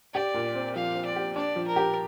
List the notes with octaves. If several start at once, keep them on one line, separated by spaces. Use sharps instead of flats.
G4 D5
A#2
C4
F3 F5
C4
D5
G4
D4 D5
F3
A#4
G4